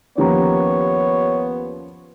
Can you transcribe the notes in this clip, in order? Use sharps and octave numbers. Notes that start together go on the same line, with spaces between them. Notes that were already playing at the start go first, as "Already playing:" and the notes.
D#2 F3 B3 C#4 G4 C#5 A#5